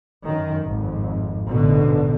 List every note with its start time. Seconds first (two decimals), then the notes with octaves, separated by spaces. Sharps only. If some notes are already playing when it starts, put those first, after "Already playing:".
0.24 F#2 D#3
0.63 G#1 F2
1.48 A1 G#2 B2 D3